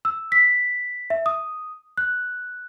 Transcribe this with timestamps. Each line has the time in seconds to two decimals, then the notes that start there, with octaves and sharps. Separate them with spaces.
0.05 E6
0.32 B6
1.10 E5
1.26 D#6
1.97 F#6